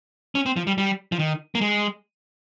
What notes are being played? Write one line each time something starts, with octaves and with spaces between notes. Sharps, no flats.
C#4
C4
F3
G3
G3
F3
D#3
A#3
G#3